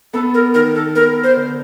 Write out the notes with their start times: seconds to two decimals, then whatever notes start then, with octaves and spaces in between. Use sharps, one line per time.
0.13 B3 A4
0.34 A#4
0.54 D#3 A#4
0.75 A4
0.95 B3 A#4
1.23 C5
1.36 D3